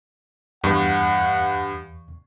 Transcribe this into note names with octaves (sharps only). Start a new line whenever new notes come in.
E2 G2 F#5 C#6